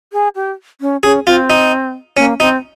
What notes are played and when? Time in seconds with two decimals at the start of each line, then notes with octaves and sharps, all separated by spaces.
0.13 G#4
0.35 G4
0.81 C#4
1.03 C#4 G#4
1.26 C4 F4
1.50 D#4
2.17 A#3 C#4
2.40 C4 D#4